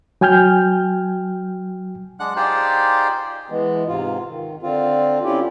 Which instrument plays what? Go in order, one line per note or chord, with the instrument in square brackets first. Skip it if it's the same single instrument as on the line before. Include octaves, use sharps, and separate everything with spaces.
[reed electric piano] F#3 G5 G#5 F6 G6
[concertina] G#3 D4 F#5 F#6
D#4 F4 G4 G#4 C5 D5
[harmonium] E3 G#3 B3
G#2 C3 F4
D#3
D3 C4 F4
C4 C#4 E4 F4 G4